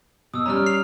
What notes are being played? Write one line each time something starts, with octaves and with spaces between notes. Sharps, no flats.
B2 D#6 E6
G3 C#4 A#5 F6
F6 C7 F7